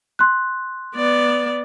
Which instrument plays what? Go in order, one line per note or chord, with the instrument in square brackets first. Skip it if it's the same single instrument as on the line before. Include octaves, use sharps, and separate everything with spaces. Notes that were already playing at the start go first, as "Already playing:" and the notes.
[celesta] C6 F#6
[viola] B3 D5